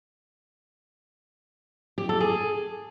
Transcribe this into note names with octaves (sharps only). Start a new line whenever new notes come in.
G4
A4
G#4